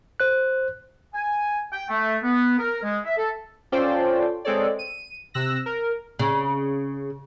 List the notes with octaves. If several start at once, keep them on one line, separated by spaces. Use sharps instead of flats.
C5 F#6
G#5
G5
A3
B3
A#4
G#3
E5
A4
C#4 F4 A4 C5 D5 G5
G#3 C4 A4 C#5 D5
D#7
C3 E6 F#6 A#6
A#4
C#3